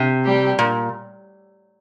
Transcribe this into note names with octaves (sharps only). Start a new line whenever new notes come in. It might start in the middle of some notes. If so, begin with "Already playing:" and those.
Already playing: C3
G3 G4
A#2